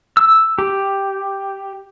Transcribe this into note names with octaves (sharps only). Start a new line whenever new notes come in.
E6
G4